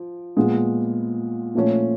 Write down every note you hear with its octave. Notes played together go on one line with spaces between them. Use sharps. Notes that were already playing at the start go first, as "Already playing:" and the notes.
Already playing: F3
A#2 F3 G#3 B3
A#2 F3 A3 C#4